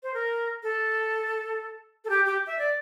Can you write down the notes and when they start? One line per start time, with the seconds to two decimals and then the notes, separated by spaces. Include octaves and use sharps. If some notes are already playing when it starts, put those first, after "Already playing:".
0.03 C5
0.14 A#4
0.63 A4
2.05 A4
2.10 G4
2.26 G4
2.47 E5
2.59 D5